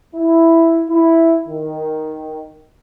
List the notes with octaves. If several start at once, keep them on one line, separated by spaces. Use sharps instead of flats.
E4
E4
D#3